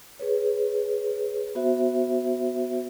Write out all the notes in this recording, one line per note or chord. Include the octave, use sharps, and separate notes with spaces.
G#4 B4 C#5
B3 F#4 C5 E5